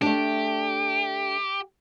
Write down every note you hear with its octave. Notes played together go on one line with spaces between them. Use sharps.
A3 D4 G4